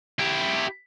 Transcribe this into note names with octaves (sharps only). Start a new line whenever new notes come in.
E4 G4